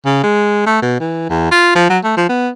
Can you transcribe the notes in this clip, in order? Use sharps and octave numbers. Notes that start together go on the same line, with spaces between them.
C#3
G#3
A3
B2
E3
E2
F4
F3
F#3
A3
F3
B3